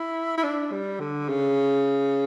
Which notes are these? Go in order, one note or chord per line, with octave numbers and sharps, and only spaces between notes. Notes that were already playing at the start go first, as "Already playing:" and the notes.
Already playing: E4
E4
D4
G3
D3
C#3